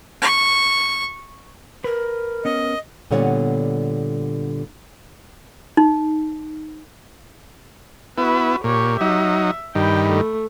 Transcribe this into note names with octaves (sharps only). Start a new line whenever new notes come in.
C#6
A#4 B4
B3 C#4 D#5
A#2 D3 G3 B3 C#5 F#5
D#4
B3 E4 F#4 B4
A#2 G4 C#5
F#3 D#4 E5
G2 D#3 G5 B5
A3